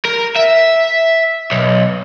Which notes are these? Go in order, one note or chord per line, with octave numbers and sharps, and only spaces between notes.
A#4
E5
B1